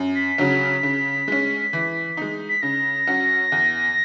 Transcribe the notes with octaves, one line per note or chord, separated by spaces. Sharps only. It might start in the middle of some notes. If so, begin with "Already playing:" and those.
Already playing: F#2
B6
C#3 F#3 C#4
C#3
G#3 C#4
E3
G#3 D#4
B6
C#3 A#6
F#3 C#4 F#4
E2